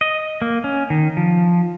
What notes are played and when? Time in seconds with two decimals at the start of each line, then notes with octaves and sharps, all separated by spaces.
0.01 D#5
0.42 A#3
0.64 C#4
0.90 D#3
1.17 F3